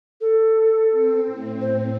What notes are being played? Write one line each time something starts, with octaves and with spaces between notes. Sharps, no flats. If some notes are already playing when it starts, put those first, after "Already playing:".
A4
C4
A2
C5